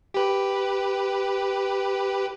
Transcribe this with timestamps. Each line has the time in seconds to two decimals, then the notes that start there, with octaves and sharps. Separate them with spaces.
0.14 G4 B4